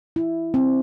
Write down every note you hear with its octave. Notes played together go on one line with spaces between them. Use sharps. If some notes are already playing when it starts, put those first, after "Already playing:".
E4
C4